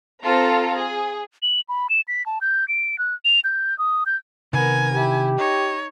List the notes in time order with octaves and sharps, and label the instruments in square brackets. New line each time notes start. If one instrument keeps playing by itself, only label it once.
[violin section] C4 F4 A4 A#5
G#4
[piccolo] F#7
B5
E7
B6
A5
G6
D7
F#6
F7
G6
D#6
G6
[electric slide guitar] C3 D#3 [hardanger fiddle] B3 A#4 [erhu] G#5
[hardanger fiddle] E4 [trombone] G4
[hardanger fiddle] D#4 [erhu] C#5 [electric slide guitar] D#5